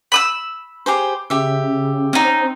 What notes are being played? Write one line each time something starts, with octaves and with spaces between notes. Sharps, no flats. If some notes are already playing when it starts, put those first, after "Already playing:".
B5 D#6 E6
G4 G#4 C5
C#3 G4 E5
C4 C#4 D#4